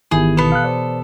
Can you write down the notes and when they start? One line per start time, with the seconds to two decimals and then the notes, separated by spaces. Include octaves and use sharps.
0.11 G#1 D#3 E3 B3 E4 G4 G#4
0.37 B2 B3 A4
0.52 F5 D#6 F#6
0.64 C5 D5